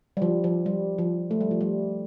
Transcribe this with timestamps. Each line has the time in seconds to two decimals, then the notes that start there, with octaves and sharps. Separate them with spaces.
0.17 G3
0.22 F3
0.44 F3
0.66 G3
0.98 F3
1.31 A3
1.41 G3
1.51 F3
1.61 G3